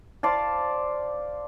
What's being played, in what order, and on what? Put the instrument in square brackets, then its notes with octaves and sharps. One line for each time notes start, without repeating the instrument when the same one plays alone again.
[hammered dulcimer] C5 D5 F5 A5